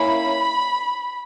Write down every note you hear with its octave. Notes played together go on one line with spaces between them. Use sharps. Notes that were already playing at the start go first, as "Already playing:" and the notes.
Already playing: A#3 C#4 E4 B5